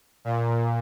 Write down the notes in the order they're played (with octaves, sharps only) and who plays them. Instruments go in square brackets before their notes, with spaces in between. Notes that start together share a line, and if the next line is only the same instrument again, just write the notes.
[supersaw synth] A#2